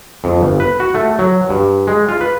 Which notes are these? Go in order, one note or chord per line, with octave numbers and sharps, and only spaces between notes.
F2
G1
B4
F#4
A3
F#3
G2
G#3
F4
B4